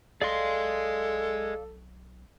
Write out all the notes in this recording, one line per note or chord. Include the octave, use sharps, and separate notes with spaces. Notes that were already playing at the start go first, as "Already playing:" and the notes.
B1 G#4 A4 D5 D#5 F5 C6